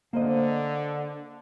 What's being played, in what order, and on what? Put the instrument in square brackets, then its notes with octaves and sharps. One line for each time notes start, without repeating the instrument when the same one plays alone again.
[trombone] D3 [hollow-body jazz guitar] A#3 C5 D#5